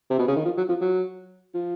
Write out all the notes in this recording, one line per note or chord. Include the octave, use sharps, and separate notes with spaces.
C3
B2
C#3
D#3
F3
F#3
F3
F#3
F3